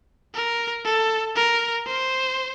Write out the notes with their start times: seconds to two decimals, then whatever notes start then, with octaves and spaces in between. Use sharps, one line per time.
0.34 A#4
0.84 A4
1.35 A#4
1.87 C5